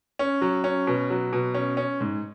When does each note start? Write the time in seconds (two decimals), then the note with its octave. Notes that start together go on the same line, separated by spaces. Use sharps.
0.19 C#4
0.41 F#3
0.64 C#4
0.87 B2
1.10 F#3
1.33 B2
1.54 C#4
1.77 C#4
2.01 G#2